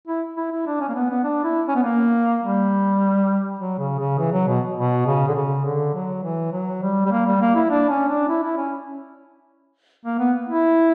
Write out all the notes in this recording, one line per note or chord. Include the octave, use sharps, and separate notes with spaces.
E4
E4
E4
D4
C#4
A#3
B3
B3
D4
E4
C#4
B3
A#3
G3
F#3
C#3
C#3
E3
F#3
B2
B2
C#3
D3
C#3
D3
F#3
E3
F#3
G3
G3
A#3
G3
A#3
E4
D4
C#4
D4
E4
E4
C#4
A#3
B3
E4